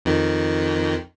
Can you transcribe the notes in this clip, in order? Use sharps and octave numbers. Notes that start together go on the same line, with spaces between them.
F2 D#3